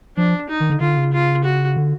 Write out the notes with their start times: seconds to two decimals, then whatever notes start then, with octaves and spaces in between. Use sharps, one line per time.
0.17 F3 D4
0.49 D#4
0.60 D#3
0.70 D3
0.80 D3 F4
0.97 C#3
1.13 F4
1.44 F#4
1.77 D3